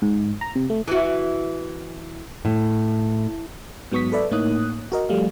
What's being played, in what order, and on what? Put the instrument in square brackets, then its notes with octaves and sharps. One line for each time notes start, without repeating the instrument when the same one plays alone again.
[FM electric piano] G#2
A#5
C3
A3
[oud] E3 F#4
[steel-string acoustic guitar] A2
[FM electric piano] G#2 F#3 B3 C#6 D#6 B6
A4 B4 D5 E5
A2 A#3 D#4 C#5 D#6 F#6
F#4 A#4 D#5
F3 G3 A3 F5